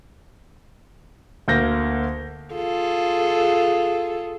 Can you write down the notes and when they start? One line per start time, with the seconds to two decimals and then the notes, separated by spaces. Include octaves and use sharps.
1.48 D2 A#3 G6 A#6
2.54 F4 G#4 A4